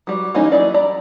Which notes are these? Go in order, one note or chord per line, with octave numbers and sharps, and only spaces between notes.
F#3 G3
E3 G3 A#3 C#4 D#4
F#3 E4 D5
D5 A#5 B5